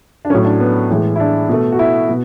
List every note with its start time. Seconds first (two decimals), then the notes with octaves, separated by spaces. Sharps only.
0.25 D4
0.30 A2 F#3 A3 C#4
0.45 D4
0.60 B3
0.90 A2 E3 G#3
1.16 E4
1.20 D4
1.49 B2 A3
1.72 F#4
1.79 E4
2.09 B2